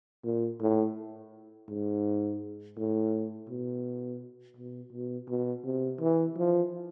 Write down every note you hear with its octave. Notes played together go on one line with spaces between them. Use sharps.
A#2
A2
G#2
A2
B2
B2
B2
B2
C3
E3
F3